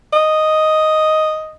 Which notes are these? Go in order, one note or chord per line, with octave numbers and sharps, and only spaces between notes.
D#5